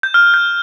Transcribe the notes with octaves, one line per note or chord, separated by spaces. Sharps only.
G6
F6
G6